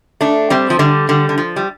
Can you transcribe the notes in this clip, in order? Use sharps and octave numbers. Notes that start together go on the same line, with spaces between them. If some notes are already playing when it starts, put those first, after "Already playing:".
A3 D4
G3 C4
F3
D3 G3
D3 G3
D3
F3
G3